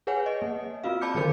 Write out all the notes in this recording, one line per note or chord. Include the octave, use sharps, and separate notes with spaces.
G#4 B4 C#5 F#5 G#5
D#5
A#3
C4 F4 F#4 F5
D5 A5 B5 D6 G6 C#7
D3 D#3 F#3 A#4 C5 C#7